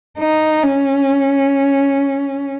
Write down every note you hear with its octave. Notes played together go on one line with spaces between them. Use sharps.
D#4
C#4